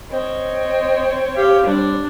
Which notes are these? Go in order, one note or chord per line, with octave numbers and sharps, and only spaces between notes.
C4 C#5 D#5
G4 F5
G3 D4